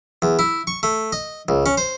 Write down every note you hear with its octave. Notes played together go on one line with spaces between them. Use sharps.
E2
E4
C#6
A3
D#5
C#2
C#4
C5